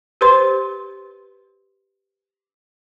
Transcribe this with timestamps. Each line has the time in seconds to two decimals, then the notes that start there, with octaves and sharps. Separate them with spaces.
0.21 G4 B4 C5 C6